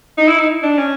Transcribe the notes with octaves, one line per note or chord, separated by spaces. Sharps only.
D#4
E4
D#4
D4
C#4